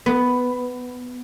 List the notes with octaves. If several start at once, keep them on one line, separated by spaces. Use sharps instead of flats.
B3